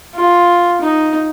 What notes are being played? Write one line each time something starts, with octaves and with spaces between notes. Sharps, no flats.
F4
D#4